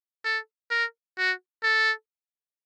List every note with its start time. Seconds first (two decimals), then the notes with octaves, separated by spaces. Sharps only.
0.24 A4
0.70 A#4
1.18 F#4
1.63 A4